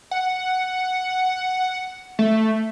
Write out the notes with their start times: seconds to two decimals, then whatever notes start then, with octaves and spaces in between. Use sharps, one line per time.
0.11 F#5
2.19 A3